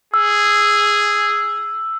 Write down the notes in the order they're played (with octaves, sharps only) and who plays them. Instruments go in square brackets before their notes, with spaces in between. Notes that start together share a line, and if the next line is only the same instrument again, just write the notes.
[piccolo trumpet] G#4 [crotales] E6